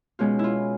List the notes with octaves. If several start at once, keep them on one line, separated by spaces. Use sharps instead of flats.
B2 G#3 C#4 F4
E4 F4